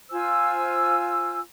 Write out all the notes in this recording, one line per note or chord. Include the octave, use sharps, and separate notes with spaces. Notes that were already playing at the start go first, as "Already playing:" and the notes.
F4 C5 G#5 E6